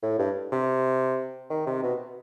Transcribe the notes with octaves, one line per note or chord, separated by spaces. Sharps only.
A2
G2
C3
D#3
C3
B2